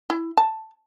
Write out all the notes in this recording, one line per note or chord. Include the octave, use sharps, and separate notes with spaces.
E4
A5